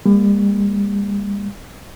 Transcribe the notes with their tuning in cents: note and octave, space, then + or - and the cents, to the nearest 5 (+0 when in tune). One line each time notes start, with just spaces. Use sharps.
G3 +45 A#3 +0